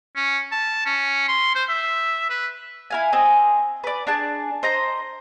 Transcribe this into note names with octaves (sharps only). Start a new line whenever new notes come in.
C#4
A5
C#4
C6
C5
E5
B4
E4 F5 G#5
C4 G#4 D#5
B4 D5
D4 G#4 A5
C5 D#5 A#5